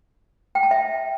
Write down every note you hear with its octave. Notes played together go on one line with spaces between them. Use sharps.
G5
A5
E5